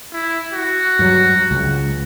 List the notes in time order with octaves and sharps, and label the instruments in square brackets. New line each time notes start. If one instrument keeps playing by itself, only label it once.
[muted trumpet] E4
F#4
[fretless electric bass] G2 F#3
C#2